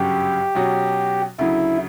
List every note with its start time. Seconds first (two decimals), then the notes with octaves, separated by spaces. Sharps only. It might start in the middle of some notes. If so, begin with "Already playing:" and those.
Already playing: G1 F#2 C#3 F#3 G4
0.55 B2 F#3 C#4 F#4
1.39 D2 C#3 F#3 E4